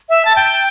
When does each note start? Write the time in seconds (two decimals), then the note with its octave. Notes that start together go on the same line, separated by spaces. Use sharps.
0.09 E5
0.25 A5
0.36 G5